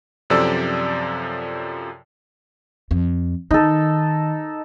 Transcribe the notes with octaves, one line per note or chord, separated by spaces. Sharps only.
F#2 C3 F3 A4 D5 E6
F2
D#3 D#4 A4